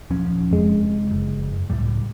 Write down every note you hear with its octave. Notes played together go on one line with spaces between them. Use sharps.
D#1 F3 C#4
F1 F2 G#3
F#1
C#2 A2 G3